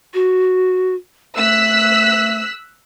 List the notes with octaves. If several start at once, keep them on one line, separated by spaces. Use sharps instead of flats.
F#4
A3 E6 F#6 B6